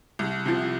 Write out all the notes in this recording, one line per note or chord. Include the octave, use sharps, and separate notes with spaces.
C2
C3 F3